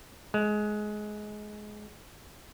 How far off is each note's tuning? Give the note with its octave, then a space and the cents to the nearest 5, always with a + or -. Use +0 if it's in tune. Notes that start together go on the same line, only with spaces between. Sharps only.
G#3 +20